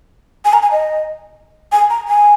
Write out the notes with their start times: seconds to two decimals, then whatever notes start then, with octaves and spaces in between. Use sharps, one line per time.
0.45 G#5
0.53 A#5
0.63 G#5
0.72 D#5
1.72 G#5
1.90 A#5
2.08 G#5